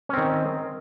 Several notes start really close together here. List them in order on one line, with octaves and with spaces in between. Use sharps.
C#4 C4 D#3